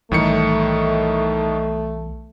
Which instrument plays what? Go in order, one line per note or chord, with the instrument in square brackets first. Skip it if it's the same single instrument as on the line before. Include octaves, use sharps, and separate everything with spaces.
[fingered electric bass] B1 E3 G3 [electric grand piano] A2 D#3 C#7 [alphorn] A3